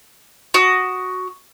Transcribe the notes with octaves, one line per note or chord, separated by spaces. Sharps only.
F#4 D#6